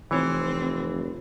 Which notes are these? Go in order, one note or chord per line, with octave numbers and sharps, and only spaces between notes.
F1 E3 C4 C#5